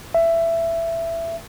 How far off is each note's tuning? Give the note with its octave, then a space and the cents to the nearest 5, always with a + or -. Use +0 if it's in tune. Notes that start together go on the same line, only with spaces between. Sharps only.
E5 +15